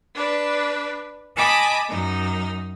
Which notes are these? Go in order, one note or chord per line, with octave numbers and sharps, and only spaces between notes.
D4 B4 D5
D#5 G#5 A5 B5 D6 D#6
F#2 D#4